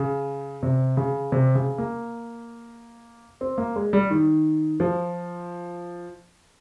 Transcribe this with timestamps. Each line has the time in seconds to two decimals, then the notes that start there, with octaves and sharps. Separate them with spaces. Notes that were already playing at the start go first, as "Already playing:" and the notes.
Already playing: C#3
0.63 C3
0.97 C#3
1.32 C3
1.55 C#3
1.78 A#3
3.41 C4
3.58 A#3
3.76 G#3
3.93 G3
4.10 D#3
4.80 F3